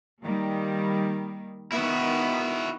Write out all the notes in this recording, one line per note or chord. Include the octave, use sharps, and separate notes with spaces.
D#3 G3 A#3
D#3 B3 E4 F#4